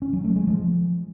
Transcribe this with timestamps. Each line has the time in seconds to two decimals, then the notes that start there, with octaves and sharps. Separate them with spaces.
0.02 C#4
0.13 F#3
0.24 A3
0.36 G#3
0.47 F3